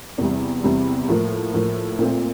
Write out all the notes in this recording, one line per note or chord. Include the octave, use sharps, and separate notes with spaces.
E2 C3 G3
E2 C3 G3
A2 F3 A#3
A2 F3 A#3
A#2 A3 C4